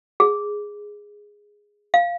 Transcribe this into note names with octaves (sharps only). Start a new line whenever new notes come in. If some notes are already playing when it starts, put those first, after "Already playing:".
G#4
F5